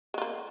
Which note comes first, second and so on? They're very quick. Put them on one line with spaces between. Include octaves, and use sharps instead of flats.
G#3 F4 A#3